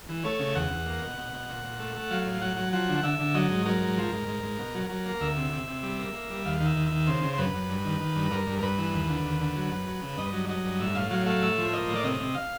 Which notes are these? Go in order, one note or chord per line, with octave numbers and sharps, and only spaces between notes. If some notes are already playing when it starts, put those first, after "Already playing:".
E3
A3 C#5
C#3
E2 F#5
E2
A#3
B2
B2
B2
A#2
A#2
A3
A3
F#3 F5
A2
F#3 F#5
F#3
F3 F#5
D3
D3 E5
D3
F#3 D#5
G#2
F#3 A#4
G#2
F3
G#2
G#2
G#2
B2
F#3
F#3
A#3
D2 E5
C3
C3
C3
G3
A#3
A#3
G3
D#2 F5
D#3
E5
D#2
D#3 E5
C#3 C5
C#3
C5
F#2 B4
F#2
G2
D#3
D#3
G2
G2 A#4
G2
A#4
G2 B4
E3
D#2
D3
D#2
D3
F#3
F#2
F#3
C#3
G2 D#5
F#3
F#3 D#5
G2
A2 E5
A2 F5
F#3 F5
A3 F5
A2 E5
F3
A#3 D#5
A2
D5
C3 D#5
C3
F5